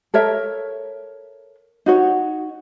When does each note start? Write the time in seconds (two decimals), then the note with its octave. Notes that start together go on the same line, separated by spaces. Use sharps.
0.14 A4 A#4 C#5 E5
1.86 D#4 F#4 C#5